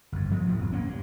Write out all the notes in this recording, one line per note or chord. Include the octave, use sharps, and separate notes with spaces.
G1 F2
F3 F#3 A3 B3
B1 A2 C3
E1
A#3 B3 C#4
G2